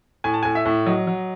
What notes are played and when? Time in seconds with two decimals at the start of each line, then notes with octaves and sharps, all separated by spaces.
0.24 A2 G#5
0.34 A5
0.43 A2 G#5
0.55 E5
0.65 A2
0.86 F#3 D#5
1.07 F#3